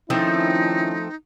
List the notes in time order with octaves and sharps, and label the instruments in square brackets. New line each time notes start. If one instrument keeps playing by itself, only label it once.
[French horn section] D#3 C#4 E4 [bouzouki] F3 A3 C4 [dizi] D#4